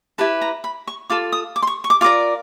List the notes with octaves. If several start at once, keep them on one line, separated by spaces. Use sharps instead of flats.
E4 G4 B4 A5
A#5
B5
C#6
F4 A4 D6
D#6
D6
C6
C#6
C#6
D6
F4 A#4 D5 D6